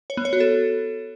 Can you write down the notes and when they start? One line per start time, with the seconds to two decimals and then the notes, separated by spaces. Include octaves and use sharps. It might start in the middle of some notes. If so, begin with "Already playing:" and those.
0.10 C#5
0.17 B3
0.25 C#5
0.33 F#4
0.40 A4